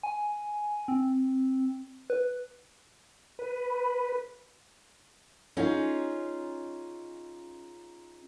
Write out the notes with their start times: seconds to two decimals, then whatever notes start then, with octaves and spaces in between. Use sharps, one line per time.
0.03 G#5
0.88 C4
2.10 B4
3.39 B4
5.57 C#4 D#4 F4 G#4